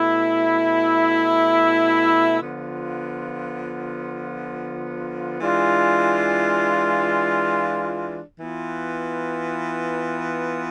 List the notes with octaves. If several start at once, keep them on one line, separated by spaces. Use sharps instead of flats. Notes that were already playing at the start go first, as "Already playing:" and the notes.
Already playing: B2 A3 E4
D3 F3 B3 F4
E3 G#3 D4 F4
E3 B3 F4